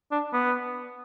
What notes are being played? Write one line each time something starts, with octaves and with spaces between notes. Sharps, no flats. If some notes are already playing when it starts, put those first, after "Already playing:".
D4
B3